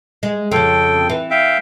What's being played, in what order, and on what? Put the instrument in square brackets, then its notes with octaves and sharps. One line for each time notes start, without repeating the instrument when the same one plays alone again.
[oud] G#3 G#4
[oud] F2 C#3 [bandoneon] A4 G5
[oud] E3
[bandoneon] E5 F5 G5